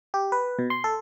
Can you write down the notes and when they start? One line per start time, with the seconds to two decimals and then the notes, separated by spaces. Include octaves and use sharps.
0.14 G4
0.32 B4
0.59 B2
0.70 C6
0.84 A4